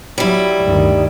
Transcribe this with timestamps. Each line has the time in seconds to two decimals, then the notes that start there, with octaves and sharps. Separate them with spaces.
0.18 F#3 G3 E4
0.62 D2 G2 D#3